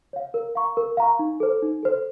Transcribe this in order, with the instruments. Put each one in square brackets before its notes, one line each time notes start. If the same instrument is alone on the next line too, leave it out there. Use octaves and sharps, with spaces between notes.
[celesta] C#5 F5
A#4
F5 A#5 C#6
A#4
F5 A#5 C#6
D#4
A4 C5
D#4
A4 C5